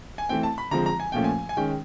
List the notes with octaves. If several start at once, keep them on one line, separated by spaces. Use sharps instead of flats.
G#5
E3 A3 C4 G5
A5
B5
D3 F3 G#3 C4 A#5
A#5
G#5
A#2 F3 A3 C#4 G5
G#5
G#5
D#3 G#3 C#4 G5